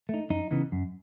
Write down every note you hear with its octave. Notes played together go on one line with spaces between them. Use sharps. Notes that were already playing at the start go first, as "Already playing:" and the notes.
A3 D#4
F#2 D#4
C#3 E3 B3 D#4
F#2